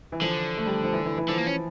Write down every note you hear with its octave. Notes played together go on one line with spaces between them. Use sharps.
E3
D3 F3
A3
G3
F3
E3
E3
E3
D3 F3
A#3
C#4